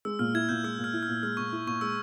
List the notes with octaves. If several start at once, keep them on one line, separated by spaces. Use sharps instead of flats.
G#3 E6
A#2 F6
E4 G#6
A#2 G6
G#3 E6
A#2
F6
E4
F6
A#2
G#3 F6
A#2 C#6
E4
A#2 C#6
G#3 E6